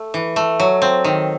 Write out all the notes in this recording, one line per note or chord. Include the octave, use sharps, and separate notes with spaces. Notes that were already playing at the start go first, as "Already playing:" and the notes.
Already playing: A3
E3
A3
F#3
C4
D#3